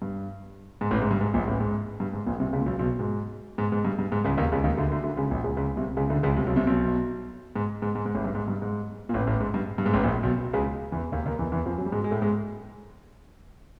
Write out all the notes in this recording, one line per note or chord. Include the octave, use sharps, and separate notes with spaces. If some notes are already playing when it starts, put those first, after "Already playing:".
G2
G#2
A1 A2
G#2
G2
G#2
A#1 A#2
A1 A2
G#2
G2
G#2
A#1 A#2
C2 C3
C#2 C#3
A#2
B1 B2
B1 B2
G#2
G#2
G#2
G2
G2
G#2
C#2 C#3
D#2 D#3
C#2 C#3
D#2 D#3
D2 D3
D2 D3
D2 D3
C#2 C#3
A#1 A#2
C#2 C#3
C#2 C#3
C2 C3
C#2 C#3
D2 D3
C#2 C#3
C2 C3
B1 B2
C2 C3
B1 B2
G#2
G#2
G#2
G#2
A1 A2
G2
G#2
G2
G#2
A#2
A1 A2
A1 A2
G#2
G2
G2
G#2
A1 A2
A#1 A#2
B1 B2
C#2 C#3
E2 E3
D#2 D#3
D#2 D#3
E2 E3
E2 E3
F2 F3
F#2 F#3
G3
G#2 G#3
G#3
A2 A3
G#2 G#3